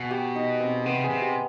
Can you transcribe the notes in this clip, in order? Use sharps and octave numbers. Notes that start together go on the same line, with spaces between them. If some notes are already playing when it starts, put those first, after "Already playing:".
Already playing: B2 G#4
G4
D#4
C4
C3 B3
G#4
C3
G4